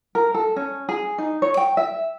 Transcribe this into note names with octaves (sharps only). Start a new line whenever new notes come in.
A#4
A4
C#4
G#4
D#4
C#5
G5
E5